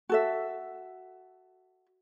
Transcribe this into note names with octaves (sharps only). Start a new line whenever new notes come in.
F#4 A4 E5